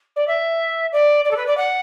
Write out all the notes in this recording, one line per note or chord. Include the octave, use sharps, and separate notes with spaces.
D5
E5
D5
D5
A4
B4
D5
F#5